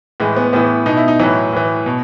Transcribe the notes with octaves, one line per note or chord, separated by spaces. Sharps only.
A2 E3 G#3
B3
A2 E3 B3
B2 D#4
E4
D#4
A2 E3 F#3
A2 E3
B2